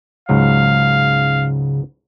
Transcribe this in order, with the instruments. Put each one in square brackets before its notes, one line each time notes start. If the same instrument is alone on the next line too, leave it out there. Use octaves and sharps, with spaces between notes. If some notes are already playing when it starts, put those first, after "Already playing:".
[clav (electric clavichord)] C#2 G#2 F#3 [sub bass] C#3 [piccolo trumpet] F5